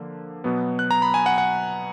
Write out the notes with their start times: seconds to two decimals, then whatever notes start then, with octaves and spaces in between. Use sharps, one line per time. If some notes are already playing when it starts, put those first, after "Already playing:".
Already playing: D3 F3 A#3
0.44 B2 F#3 B3
0.79 F#6
0.91 A#5
1.02 B5
1.14 G#5
1.26 F#5
1.38 F#5